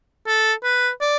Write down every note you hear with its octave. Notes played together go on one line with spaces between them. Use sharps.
A4
B4
D5